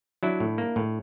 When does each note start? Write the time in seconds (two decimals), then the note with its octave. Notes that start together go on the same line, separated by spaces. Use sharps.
0.23 F#3 D4 E4
0.40 A2
0.58 A#3
0.76 A2